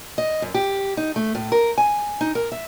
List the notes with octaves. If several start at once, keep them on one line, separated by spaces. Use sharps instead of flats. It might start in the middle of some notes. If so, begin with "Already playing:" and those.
D#5
F#2
G4
D#4
A3
A2
A#4
G#5
D#4
A#4
E5